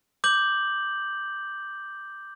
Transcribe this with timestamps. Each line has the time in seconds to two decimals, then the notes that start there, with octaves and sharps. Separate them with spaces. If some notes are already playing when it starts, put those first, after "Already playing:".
0.24 D6 G6 F#7